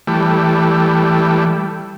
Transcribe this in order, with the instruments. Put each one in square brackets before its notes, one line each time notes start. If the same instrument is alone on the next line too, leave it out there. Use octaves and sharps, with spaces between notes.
[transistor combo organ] E3 G3 A3